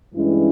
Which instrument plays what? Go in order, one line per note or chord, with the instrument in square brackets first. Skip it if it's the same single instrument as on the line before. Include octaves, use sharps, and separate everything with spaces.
[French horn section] G2 E3 G#3 C#4 E4